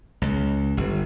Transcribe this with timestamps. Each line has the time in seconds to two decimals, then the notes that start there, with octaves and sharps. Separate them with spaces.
0.22 C#2
0.77 G1